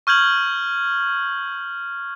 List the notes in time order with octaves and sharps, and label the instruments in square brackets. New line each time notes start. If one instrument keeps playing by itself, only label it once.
[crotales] C#6 F6 G6 G#6 F#7